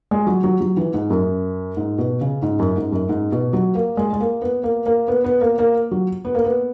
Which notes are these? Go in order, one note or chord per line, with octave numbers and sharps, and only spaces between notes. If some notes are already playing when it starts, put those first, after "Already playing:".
G#3
F#3
F#3
F#3
E3
G#2
F#2
G#2
B2
C#3
G#2
F#2
G#2
F#2
G#2
B2
F#3
A#3
G#3
G#3
A#3
B3
A#3
A#3
B3
B3
A#3
A#3
F#3
B3
A#3
B3